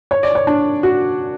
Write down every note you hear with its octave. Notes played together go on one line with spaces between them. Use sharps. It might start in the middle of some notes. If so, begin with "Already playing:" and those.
C#5
D5
C#5
D4
F#4